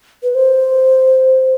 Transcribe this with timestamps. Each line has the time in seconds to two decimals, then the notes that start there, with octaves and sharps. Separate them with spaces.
0.23 B4
0.35 C5